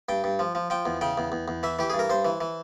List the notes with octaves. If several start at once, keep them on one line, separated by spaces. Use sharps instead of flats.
G2 G5
G2
F3
F3
F3 G5
E2
C#3 G5
E2
E2
E2
E3 E5
E3 G4
G2 G#4
A#4
G2 C5
E3
E3